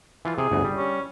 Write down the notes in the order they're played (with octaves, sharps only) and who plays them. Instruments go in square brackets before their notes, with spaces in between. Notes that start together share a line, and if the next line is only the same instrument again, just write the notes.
[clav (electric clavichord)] E3 F4
[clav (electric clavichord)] C3 [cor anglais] G#4
[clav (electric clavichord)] G1 D2
G3
[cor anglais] C#4